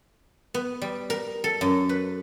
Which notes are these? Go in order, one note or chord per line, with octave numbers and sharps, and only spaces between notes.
B3
G3
A#4
A4
F#2
B4